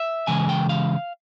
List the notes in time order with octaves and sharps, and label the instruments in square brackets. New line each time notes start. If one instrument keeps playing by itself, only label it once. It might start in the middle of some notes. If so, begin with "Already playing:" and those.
Already playing: [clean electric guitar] E5
C#3 E3 G#3 G#5
G5
F5